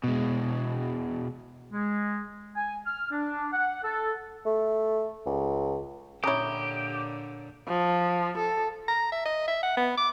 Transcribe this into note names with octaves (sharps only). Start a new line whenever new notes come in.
B2 G#3
G#3
G#5
F6
D4
F#5
A4
A3
C#2
A#2 D3 C#4 E4 G4 C#5 A#5 D#6
F3
A4
A#5
E5
D#5
E5
F#5
B3
D6